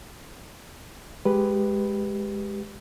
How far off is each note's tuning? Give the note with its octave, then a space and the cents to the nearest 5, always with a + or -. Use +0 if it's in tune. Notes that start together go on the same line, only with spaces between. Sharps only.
G#3 +0 G4 +0 B4 +0